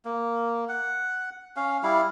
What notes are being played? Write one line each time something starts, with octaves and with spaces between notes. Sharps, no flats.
A#3
F#5
C#4 F5
G3 E4 F5